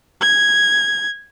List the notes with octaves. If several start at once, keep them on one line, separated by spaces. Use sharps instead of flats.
G#6